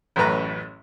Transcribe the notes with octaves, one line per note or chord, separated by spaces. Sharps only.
A1 F#2 A2 B4 A#5